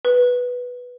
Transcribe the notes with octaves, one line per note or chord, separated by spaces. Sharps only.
B4